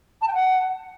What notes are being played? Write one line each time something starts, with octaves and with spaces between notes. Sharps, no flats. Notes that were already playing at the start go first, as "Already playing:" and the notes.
A5
G5
F#5